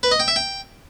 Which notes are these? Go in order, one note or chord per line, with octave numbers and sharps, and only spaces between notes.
B4
D#5
G5
E5
G5